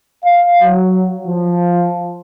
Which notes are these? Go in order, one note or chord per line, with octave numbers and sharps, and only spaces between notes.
F5
F#3
F3